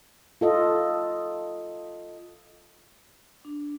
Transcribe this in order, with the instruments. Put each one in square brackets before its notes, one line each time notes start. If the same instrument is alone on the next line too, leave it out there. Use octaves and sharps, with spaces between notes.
[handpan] F4 A4 D#5
[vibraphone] D4